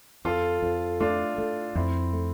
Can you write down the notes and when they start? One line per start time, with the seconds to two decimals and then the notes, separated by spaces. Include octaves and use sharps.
0.25 F2 F4 A4
0.63 F2
1.00 A3 D4 F4
1.38 A3
1.75 F2 C4 E4
2.13 A3